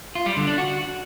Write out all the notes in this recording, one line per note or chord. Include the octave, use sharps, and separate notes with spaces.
F4
G3
D3
D4
F#4